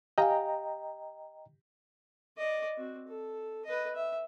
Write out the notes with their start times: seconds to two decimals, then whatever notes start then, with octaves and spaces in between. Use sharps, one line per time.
0.18 G4 D#5 F5 G5 G#5 A#5
2.38 D5 D#5
2.77 C4 F#4
3.08 A4
3.65 B4 D#5
3.95 E5